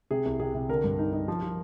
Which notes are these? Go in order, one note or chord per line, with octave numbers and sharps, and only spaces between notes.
C3 G#4
C2
C3 G#4
C3
D3 A#4
G2
D#4
D#4
F3
F3